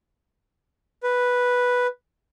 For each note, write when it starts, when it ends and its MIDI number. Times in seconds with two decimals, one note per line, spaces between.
1.03 1.87 71